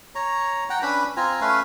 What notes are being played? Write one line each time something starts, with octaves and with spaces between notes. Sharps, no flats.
C#5 A#5
F#5 G5 A#5
C#4 D4 B4 B5
C4 F4 G#5 A#5
A3 C#4 B4 F5